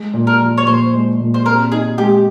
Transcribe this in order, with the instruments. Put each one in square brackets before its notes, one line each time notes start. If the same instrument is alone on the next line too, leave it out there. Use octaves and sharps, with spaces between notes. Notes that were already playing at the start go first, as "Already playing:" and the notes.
Already playing: [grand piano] G#3
A#2
[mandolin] A#4
[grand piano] F3
[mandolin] C#5
[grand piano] A#2 [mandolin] C5
[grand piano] G#3
A#2
[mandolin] C5
[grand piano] C4 [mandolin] A#4
[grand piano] D#4 [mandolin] G#4
[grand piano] G#3 [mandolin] G4